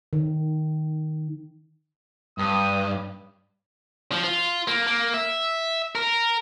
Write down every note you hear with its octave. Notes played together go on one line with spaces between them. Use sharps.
D#3
G2 D#6
F3
F4
A#3
A#3
E5
A#4